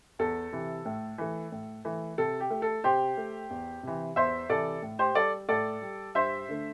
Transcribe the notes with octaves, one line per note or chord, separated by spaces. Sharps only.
E2 A4
C3 E3
A2
E3 A3
A2
E3 A3
C3 A4
G4
A3
A4
C3 G4 C5
A3
E2
C3 E3
E2 C5 E5
C3 E3 A4 D5
A2
G4 C5
G3 A4 D5
A2 A4 D5
G3
G2 C5 E5
D3 A3